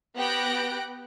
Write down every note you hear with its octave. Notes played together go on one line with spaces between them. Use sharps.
B3 G4 G5 F#6 A#6 D7